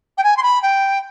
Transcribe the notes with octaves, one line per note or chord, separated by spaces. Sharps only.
G5
G#5
C6
B5
G5